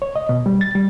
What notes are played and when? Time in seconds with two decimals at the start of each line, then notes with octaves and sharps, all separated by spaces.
0.02 C#5
0.16 D#5
0.29 B2
0.46 G3
0.61 A6
0.75 G3